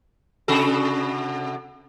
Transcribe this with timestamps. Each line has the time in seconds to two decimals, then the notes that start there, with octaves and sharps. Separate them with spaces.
0.48 C3 F#4 A4